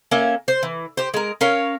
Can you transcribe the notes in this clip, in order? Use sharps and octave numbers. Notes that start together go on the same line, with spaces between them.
A#3 C#4 E5
C5
E3
G4 C5
G#3 A#4
C#4 A#4 C#5 F5